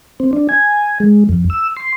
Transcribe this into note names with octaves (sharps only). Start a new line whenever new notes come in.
C4
D4
G#5
G#3
F2
E6
C6